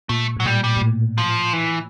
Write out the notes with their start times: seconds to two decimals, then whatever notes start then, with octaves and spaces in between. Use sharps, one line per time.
0.09 A#2 A3
0.37 A2 F#3
0.45 A#2 G3
0.64 G3
0.77 A#2
0.81 A2
1.18 F3
1.53 E3